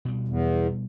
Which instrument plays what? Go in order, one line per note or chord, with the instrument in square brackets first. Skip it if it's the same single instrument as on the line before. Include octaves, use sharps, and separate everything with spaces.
[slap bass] B2 G3
[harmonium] E2